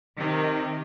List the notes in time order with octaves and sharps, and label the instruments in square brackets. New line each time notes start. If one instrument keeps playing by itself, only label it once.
[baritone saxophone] C3 [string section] D#3